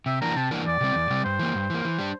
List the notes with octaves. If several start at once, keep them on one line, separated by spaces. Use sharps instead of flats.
C3 E5
E3 A#3 D4 A#5
C3 A5
E3 A#3 D4
E2 D5
C3 G3 C4
E2
C3 G3 C4
G2 C5
E3 A#3
G2
E3 A#3
E3
G3 D4